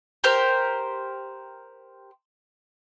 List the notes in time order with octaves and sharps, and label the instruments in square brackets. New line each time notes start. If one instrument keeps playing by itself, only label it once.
[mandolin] G4 A#4 C5